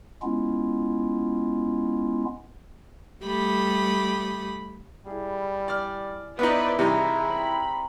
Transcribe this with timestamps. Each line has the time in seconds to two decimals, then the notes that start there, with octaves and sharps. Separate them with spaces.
0.22 G#3 B3 C#4 E4 F4
3.22 G3 A3 G4 B5 D#6
5.07 G3 E4 G#4
5.68 D5 F6
6.39 B3 D#4 E4 B4 C5 D5
6.79 C3 E3 G3 D#4 G#4 A#4 G5
7.29 C4 A#5 B5